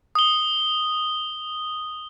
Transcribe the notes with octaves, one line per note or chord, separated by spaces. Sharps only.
D#6 G7